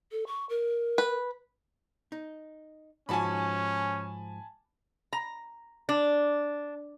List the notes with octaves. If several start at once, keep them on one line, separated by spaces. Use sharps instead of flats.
A4
C#6
A#4
B4
D#4
G#2 F3 C#4 F#4 G#5 A5 B5
A#5
D4